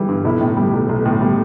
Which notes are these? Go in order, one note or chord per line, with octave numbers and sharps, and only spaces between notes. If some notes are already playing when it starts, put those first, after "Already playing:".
Already playing: E3 G3
G2
B1 E4
A2
G3
B1
B1
A2
G3